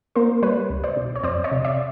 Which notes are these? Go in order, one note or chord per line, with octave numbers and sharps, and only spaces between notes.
A#3 A#4 C5
G3 B4 C#5
C#2
C5 D5
B2
C#5
F2 C5 D5
C#5 D#5
C3
D5 E5